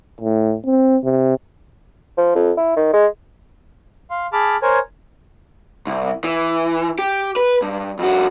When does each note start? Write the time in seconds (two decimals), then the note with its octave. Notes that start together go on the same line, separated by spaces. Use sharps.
0.21 A2
0.65 C4
1.04 C3
2.17 F3
2.35 F2
2.57 E4
2.76 D#3
2.93 G#3
4.10 F5 C6
4.33 G#4 A5 B5 D6 F6
4.62 A#4 C5 C#5 G#5
5.87 C2
6.24 E3
6.99 G4
7.36 B4
7.62 G2
7.99 F2 F#4